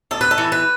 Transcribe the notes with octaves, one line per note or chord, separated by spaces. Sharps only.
D2 A4
B4
A4
E3
B4